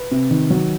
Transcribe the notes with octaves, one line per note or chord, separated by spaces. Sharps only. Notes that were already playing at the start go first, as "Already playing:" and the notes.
Already playing: B4
C3
D#3
F#3